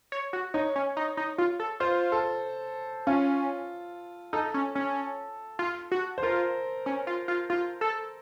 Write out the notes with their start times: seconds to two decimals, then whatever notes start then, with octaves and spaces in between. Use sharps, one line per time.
0.12 C#5
0.33 F#4
0.54 D#4 C#5
0.76 C#4
0.97 D#4
1.17 D#4
1.38 F4
1.60 A4
1.80 F4 C5
2.12 A4
3.07 C#4 F4
4.33 D#4 A4
4.54 C#4
4.75 C#4
5.59 F4
5.92 F#4
6.18 C5
6.23 F4 A#4
6.86 C#4
7.07 F4
7.28 F4
7.50 F4
7.81 A4